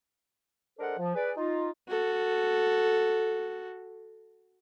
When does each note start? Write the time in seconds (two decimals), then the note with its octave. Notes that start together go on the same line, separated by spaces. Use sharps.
0.79 G#3 D4 A4 A#4 C5 F#5
0.99 F3
1.15 G#4 B4 D5
1.37 D#4 F4
1.89 F#4 A4